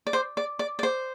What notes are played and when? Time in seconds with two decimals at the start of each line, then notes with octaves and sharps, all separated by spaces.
0.07 D5
0.13 C5
0.37 D5
0.59 D5
0.79 D5
0.83 C5